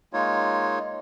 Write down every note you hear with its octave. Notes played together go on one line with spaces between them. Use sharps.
G#3 A#3 D#4 F4 C#5